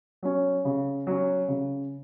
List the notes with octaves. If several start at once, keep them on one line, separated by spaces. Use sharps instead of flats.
F#3 C#4
C#3
F#3 C#4
C#3